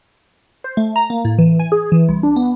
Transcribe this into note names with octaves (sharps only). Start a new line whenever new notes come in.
C5
A3
A#5
A#3
A2
E3
G#5
G#4
E3
C2
D4
B3